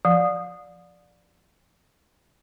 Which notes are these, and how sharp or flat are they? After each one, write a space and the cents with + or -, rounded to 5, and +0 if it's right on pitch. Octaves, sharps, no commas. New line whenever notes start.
F3 -5 F5 +45